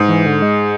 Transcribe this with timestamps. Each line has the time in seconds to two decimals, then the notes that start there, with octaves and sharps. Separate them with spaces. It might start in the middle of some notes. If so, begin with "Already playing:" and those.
Already playing: G#2
0.09 E3
0.26 D3
0.42 G#3